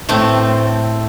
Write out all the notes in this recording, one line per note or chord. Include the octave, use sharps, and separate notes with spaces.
A2 A3 C4